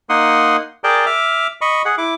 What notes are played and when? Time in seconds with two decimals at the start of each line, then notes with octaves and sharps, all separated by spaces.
0.09 A#3 D#4 F#5 C6 D#6
0.84 G#4 A#4 D5 G5 A5
1.06 E5 D6 F6
1.61 D#5 B5 C#6
1.85 G#4 F#5
1.98 E4 D6